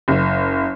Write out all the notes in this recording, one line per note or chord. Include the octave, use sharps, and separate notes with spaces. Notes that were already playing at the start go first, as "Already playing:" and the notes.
F#1